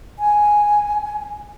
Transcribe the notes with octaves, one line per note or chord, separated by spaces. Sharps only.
G#5